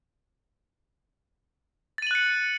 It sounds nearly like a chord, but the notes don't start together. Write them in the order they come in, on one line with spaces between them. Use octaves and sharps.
A6 D#7 F#7 F#6 C#7